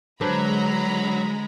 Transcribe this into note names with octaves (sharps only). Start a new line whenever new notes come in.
D3 F#3 G#3 D4 B4 C5 A#5 B5